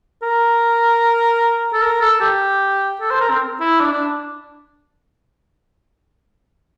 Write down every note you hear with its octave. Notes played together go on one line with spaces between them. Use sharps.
A#4
A4
A#4
A4
G4
A4
C5
A#4
C4
E4
D4
D4